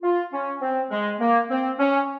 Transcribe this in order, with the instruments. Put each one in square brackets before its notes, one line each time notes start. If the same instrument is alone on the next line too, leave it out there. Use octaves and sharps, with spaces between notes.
[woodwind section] F4
C#4
C4
G#3
A#3
C4
C#4